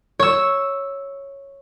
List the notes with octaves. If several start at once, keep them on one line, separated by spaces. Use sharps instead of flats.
C#5 E6